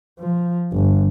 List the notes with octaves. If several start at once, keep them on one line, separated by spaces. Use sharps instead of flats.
F3
G1